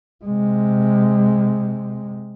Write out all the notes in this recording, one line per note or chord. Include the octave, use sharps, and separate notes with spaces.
C3 G#3